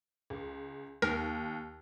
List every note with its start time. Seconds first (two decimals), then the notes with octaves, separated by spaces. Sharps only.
0.30 C#2
1.02 D#2 A#4